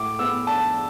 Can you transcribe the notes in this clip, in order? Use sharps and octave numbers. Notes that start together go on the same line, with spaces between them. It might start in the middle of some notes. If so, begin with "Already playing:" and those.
Already playing: A2 D6
B3 E6
D4 A5